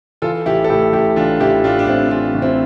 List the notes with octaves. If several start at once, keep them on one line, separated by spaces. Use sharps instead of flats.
E3 F4 A4
A1 E4 G4
A4
A2 E4 G4
A1 E4 G4
E3 D4 F4
A1 E4 G4
A2 D4 F4
D4
A1 C4 E4
E3 D4 F4
A1
C4 E4